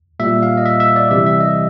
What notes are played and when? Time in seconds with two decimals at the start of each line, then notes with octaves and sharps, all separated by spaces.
0.19 A#2 G3 E5
0.43 F5
0.57 D#5
0.66 E5
0.80 E5
0.96 D5
1.11 C3 E3 G3 E5
1.26 E5
1.40 D#5